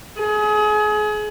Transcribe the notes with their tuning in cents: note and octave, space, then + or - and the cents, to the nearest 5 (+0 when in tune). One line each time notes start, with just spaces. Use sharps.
G#4 +30